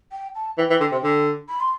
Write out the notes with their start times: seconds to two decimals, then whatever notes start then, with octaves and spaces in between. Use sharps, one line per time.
0.12 G5
0.35 A5
0.58 E3 G5
0.70 E3
0.80 D3
0.92 C3
1.03 D3
1.49 B5
1.60 C6